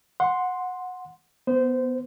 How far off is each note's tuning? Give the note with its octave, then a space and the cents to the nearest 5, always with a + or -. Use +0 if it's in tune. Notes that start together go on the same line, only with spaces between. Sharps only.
F#5 -15 C6 +0
B3 +0 C5 -20